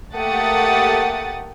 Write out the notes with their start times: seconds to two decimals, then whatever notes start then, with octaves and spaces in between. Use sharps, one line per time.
0.17 A3 A#3 G4 F#5 D#6 A6